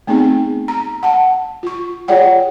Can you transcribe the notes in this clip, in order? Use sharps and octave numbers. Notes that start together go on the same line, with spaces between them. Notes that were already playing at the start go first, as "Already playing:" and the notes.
A3 B3 C4 D#4 G#4
A#5
F#5 A5
F4 C#6
F4 G#4 C#5 D5 F#5 G5